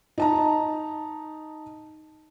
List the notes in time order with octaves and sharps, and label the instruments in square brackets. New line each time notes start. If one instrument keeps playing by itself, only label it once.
[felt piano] D#4 A5 A#5